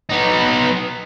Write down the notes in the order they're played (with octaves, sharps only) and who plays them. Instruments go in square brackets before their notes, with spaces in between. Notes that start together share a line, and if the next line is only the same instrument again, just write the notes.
[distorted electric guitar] B3 D#4